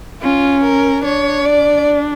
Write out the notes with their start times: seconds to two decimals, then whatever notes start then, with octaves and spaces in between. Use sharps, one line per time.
0.22 C#4 F4
0.64 A#4
1.05 D4 C#5
1.45 D5